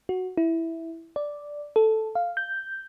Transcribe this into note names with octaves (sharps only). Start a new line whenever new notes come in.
F#4
E4
D5
A4
F5
G6